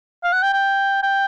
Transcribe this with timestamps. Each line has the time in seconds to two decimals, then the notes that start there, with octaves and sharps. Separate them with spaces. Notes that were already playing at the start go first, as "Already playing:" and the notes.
0.24 F5
0.33 F#5
0.43 G5
0.53 G5
1.03 G5